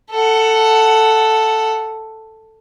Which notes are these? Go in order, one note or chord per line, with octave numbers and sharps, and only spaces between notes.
A4 F#5